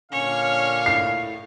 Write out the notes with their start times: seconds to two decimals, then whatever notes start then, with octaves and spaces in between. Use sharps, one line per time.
0.12 A#2 D3 C#4 C#5 F5
0.86 A2 C7